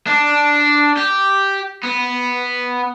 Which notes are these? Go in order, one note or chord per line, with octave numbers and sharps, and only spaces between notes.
D4
G4
B3